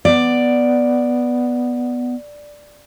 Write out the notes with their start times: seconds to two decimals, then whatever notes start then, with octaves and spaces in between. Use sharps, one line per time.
0.05 B3 D5